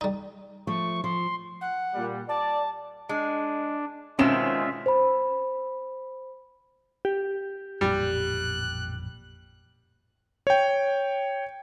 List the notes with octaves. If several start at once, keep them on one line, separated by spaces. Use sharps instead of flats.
G3 D#4
F3 A3 C#6
F3 C6
F#5
A#2 G3
D5 A5
G#3 D4
B2 D#3 G#3 C4 C#4 F4 E5 E7
C5 B5
G4
A1 F2 A#2 G3 F#6
C#5 G5